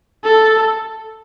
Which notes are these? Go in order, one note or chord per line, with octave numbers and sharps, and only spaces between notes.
A4